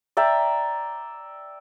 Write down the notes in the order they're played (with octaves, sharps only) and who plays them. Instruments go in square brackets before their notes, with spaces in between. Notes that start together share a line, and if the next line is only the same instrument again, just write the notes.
[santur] D5 E5 G5 A#5